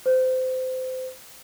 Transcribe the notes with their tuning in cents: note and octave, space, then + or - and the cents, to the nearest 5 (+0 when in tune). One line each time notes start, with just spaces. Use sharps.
C5 -25